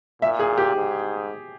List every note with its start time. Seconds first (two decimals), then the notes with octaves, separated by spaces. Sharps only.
0.22 A#2 E5
0.39 G#4
0.58 G4
0.76 G#2